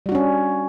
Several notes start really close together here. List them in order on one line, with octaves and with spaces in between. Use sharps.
G3 F#4 D4 C#4